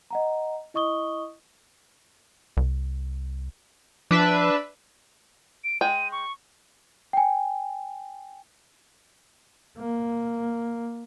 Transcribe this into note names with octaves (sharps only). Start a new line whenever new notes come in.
D#5 F#5 A#5
E4 D#5 C#6 D#6 G7
C2
F3 D4 B4 E5
D7
G#3 G5 D#7
C#6
G5 G#5
A#3